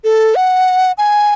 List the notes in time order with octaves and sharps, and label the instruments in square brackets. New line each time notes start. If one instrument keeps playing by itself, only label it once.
[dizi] A4
F#5
G#5